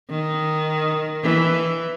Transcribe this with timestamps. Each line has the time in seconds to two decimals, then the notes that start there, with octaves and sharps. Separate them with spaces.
0.10 D#3
1.23 E3